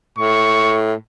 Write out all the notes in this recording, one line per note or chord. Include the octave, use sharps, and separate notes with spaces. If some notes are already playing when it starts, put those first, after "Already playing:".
A2 C#6